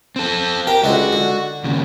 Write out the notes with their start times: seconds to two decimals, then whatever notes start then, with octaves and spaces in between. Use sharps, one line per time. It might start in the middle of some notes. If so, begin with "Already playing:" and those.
0.16 C4 A4
0.67 G4 A#4 G5
0.84 C#2 D3 G#3 F#4
1.13 D3
1.64 D#2 C#3